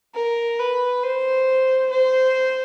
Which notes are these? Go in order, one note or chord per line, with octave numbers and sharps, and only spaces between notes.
A#4
B4
C5
C5